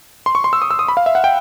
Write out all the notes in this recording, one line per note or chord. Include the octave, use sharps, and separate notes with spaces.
C6
C#6
C6
E6
D#6
E6
D#6
B5
F5
E5
F#5
G5